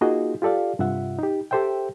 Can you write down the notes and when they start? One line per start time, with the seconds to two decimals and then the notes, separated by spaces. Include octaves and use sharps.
0.01 A#3 D#4 F4 F#4 G#4 D#5
0.42 F4 G4 A4 D5 F5
0.79 G2 C3 F4 E5 F#5
1.19 D#4 G4
1.51 G4 A4 C5 E5 G5